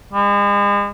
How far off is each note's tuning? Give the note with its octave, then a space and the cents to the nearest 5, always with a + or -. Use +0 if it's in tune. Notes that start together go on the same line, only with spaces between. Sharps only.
G#3 -40